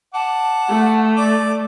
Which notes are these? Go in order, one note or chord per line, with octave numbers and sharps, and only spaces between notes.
F#5 A5 D6
A3
D5 D6